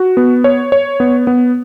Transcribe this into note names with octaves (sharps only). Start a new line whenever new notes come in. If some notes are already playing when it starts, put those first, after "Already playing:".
Already playing: F#4
B3
C#5
C#5
B3
B3